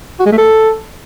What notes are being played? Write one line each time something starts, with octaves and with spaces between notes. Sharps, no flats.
F#4
G#3
A3
A4